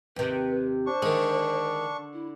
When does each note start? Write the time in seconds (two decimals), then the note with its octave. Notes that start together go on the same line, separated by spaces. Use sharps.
0.16 D#2 C3 B4
0.86 D4 C5 C#6
1.02 D3 D#3 G#3
2.13 E4